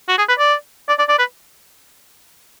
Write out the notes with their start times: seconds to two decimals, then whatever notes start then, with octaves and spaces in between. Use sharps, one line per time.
0.08 F#4
0.18 G#4
0.28 B4
0.39 D5
0.89 D5
0.99 D5
1.09 D5
1.19 B4